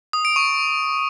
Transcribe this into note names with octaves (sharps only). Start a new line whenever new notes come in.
D#6
D7
C#6